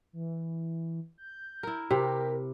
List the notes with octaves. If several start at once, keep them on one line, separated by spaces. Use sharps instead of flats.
E3
G6
E4 A#4
C3 G4 A#4